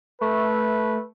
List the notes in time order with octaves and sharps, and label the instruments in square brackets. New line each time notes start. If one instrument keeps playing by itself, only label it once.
[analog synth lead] A3 [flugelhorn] B4